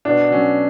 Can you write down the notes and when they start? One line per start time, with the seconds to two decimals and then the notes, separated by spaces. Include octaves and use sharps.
0.05 B2 D4
0.30 F#3 C#4